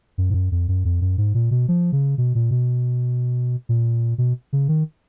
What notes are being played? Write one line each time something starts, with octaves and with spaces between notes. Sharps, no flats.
F#2
G#2
F#2
F2
F#2
F2
F#2
G#2
A#2
B2
F3
C#3
B2
A#2
B2
A#2
B2
C#3
D#3